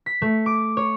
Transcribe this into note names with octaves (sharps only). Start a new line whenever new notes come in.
B6
A3
D6
C#5